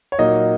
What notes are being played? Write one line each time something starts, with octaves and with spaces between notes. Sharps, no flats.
C#5
A#2 F#3 A#3 D#4 D#5